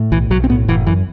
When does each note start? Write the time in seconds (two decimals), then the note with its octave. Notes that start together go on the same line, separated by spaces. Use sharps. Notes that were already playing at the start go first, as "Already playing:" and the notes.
Already playing: A2
0.12 B1 E3
0.30 B1 F#3
0.44 C4
0.49 A2 B3
0.68 F#1 E3
0.87 F#2 E3